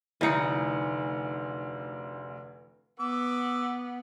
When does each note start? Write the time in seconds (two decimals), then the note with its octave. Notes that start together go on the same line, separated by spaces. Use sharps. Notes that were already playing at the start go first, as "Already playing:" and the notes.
0.21 F1 D2 E3 D#4 C#7
3.00 B3 D6 E6